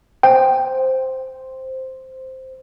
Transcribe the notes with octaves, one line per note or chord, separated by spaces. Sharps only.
C5 G5